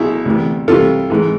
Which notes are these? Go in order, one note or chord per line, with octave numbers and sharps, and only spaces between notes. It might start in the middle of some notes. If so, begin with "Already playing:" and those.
Already playing: B1 B2 E4 G#4
D2 C3 E3
C2 C3 E3 F4 A4
G#2 E3